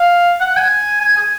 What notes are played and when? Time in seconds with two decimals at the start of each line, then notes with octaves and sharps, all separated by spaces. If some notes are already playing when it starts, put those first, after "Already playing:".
Already playing: F5
0.40 F#5
0.57 G#5
1.01 G#5
1.17 G#5